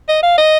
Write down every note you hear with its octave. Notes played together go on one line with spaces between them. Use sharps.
D#5
F5
D#5